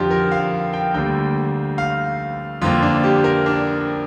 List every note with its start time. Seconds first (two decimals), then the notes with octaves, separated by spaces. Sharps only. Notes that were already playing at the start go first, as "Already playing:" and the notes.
Already playing: F2 D3 F3 D4 F4 G4
0.11 A#4
0.32 F5
0.73 G5
0.94 D2 D3 G3 A#3 G5
1.78 F5
2.62 F2 D3 F3 A#3 F4
2.83 D4
3.03 G4
3.24 A#4
3.46 D4